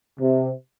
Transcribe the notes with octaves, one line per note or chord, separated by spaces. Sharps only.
C3